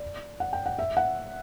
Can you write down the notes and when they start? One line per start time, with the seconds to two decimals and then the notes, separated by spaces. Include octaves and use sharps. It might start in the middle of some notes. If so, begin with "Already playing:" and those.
Already playing: D5
0.40 F#5
0.53 G5
0.66 F#5
0.79 E5
0.97 F#5